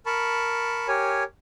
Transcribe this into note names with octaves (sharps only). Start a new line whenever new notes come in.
A#4 A5 B5 C#6
G4 A#4 C#5 G#5